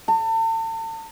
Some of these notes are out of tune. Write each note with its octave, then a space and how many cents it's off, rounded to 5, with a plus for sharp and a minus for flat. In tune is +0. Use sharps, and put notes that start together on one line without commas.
A5 +40